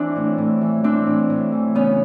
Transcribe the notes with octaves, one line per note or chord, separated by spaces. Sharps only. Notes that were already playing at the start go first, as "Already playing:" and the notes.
Already playing: E3 C4 D4
A2
A2
E3
E3 C4 D4
A2
A2
E3
C#3 B3 C#4